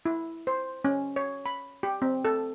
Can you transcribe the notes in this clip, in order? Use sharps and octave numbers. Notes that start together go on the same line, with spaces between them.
E4
C5
C#4
C#5
B5
G4
C4
A4